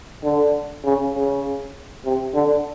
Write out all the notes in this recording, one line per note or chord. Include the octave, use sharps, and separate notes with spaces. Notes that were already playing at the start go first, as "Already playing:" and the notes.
D3
C#3
C#3
C3
D3